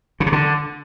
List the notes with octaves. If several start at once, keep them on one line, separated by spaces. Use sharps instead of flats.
C#3
C3
D3